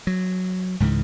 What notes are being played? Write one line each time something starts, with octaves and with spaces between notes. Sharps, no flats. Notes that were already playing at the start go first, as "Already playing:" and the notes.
F#3
C#2 G#2 C#3 E3